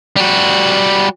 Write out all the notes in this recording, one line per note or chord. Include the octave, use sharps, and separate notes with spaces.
G3 F#4